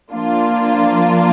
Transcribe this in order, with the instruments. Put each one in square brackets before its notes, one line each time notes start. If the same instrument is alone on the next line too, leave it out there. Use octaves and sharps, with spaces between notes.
[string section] F3 A#3 D4 F4